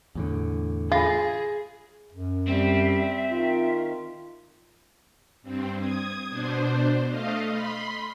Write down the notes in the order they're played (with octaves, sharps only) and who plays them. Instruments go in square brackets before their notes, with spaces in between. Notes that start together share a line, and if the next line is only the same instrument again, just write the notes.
[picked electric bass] E2 A2 D3
[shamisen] F4 [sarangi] G#4 [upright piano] G#5 B5 A#6
[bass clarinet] F#2
[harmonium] G3 [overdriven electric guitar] C4 [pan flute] E5
[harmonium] D#3 [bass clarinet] F4
[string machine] G2 C4
D#6 G#6
B2 D4 C5
A3 D#5 F5
B5 C6